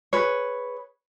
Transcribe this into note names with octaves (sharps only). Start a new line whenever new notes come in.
G#4 B4 C#5